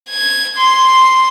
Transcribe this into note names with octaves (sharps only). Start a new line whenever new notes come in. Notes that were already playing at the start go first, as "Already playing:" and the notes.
G#6
C6